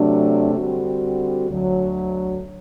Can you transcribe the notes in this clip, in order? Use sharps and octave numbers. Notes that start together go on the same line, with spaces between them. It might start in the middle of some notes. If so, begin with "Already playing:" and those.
Already playing: C3 F#3 A3 D4
D3 G3 C4 F#4
D2 D3 F#3